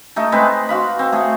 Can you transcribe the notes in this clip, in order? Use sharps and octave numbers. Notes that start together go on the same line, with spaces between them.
A3 D#4 A4
G#3 C4 B4
F#4 F5 B5
C4
A3 G#4